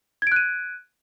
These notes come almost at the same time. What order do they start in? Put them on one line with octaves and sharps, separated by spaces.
G#6 D7 F#6 D#7